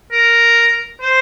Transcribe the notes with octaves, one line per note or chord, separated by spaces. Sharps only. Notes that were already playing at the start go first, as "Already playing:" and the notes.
A#4
C5